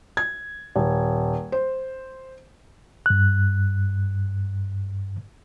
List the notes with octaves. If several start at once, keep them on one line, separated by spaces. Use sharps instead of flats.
G#6
D#1
C5
G2 F#6